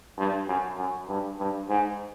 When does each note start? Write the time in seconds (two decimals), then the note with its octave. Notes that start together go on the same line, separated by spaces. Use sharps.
0.18 G2
0.48 F#2
0.78 F#2
1.08 G2
1.39 G2
1.69 G#2